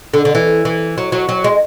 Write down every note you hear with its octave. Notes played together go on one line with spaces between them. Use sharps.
D3
D3
E3
E3
F#3
F#3
F#3
G#3